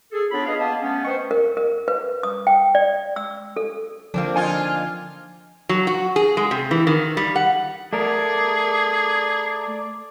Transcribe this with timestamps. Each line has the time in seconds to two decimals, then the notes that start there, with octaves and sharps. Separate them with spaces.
0.12 G#4 A4
0.31 B3 D4 F4 C#5 B5
0.46 B3 G#4 B4 D#5 F5
0.58 A#3 B3 D#5 A5
0.82 A3 B3 C#4
1.05 B4 C5 D#5 G5 C#6
1.31 A#4
1.57 A#4
1.88 B4
2.23 D#6
2.47 G5
2.75 D5
3.16 E6
3.57 A4
4.14 D3 F3 A#3 C4 D4
4.36 D#4 F4 G#5
5.69 F#3
5.87 F#4
6.16 G#4
6.37 G#3
6.51 C3
6.71 E3
6.87 D#3
7.17 G3
7.36 F#5
7.93 A3 G#4 A#4 D5